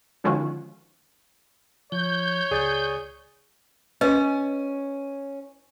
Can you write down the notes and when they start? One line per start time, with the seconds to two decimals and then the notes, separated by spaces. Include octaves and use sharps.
0.24 D3 D#3 F3 G#3 C#4 F#4
1.92 F3 C#5 G6
2.51 C#2 G#4 D5 A6
4.01 C#4 B4 D#5